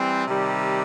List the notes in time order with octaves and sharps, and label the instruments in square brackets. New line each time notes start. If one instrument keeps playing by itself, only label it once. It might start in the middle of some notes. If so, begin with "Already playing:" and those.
Already playing: [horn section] E3 G3 C4
C3 D#3 G3